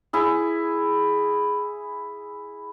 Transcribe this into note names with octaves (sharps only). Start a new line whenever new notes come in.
E4 G#4